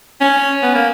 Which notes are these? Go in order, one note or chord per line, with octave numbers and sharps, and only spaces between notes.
C#4
B3
A#3